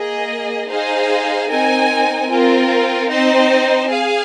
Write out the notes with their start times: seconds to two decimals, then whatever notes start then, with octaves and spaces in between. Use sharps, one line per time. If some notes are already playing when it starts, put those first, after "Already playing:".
Already playing: A#3 G#4 D#5
0.69 D#4 G#4 C5 F5
1.49 C4 D#4 A#4 G#5
2.29 C4 F4 A#4
3.09 C4 D#4 C5
3.90 G#4 F5 G#5